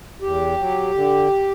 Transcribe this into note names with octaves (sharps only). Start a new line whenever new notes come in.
E2 G4
F#3
D3